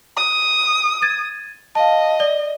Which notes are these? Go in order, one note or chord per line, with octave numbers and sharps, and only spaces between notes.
D#6
G#6 A6 D#7
D#5 F5 A5
D5 G7